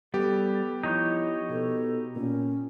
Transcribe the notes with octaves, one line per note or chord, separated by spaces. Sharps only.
G3 B3 G4 A4
F3 D#4 E4 C#5 G6
B2 A4
A#2 C#4